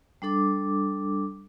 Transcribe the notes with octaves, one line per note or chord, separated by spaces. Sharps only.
G3 D4 A4 D6